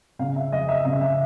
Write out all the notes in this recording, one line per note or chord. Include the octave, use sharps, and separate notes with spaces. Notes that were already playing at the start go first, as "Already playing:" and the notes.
C#3 F5
E5
F2 D#5
E5
C#3 E5
E5